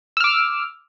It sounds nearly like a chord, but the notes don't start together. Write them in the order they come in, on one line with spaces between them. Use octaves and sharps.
E6 F6 D6